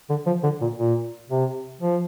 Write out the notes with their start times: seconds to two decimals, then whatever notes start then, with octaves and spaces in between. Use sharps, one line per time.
0.10 D3
0.26 F3
0.43 D3
0.61 A#2
0.78 A#2
1.30 C3
1.81 F3